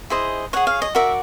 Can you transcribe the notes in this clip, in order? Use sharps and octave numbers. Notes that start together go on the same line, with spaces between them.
E4 G#4 C5 D#5
G#4 C#5 F#5
F5
D#5
F#4 A#4 D5 E5